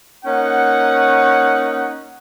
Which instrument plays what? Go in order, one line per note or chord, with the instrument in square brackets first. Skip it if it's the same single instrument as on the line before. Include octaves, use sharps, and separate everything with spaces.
[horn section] A#3 C#4 D#4 F#5